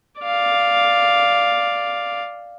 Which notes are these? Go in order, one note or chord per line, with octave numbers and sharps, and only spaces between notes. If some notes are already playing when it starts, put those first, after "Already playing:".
D5 F5